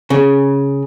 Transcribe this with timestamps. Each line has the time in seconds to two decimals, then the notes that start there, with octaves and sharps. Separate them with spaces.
0.10 C#3